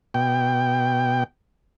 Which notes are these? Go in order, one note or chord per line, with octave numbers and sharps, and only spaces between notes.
B2 G5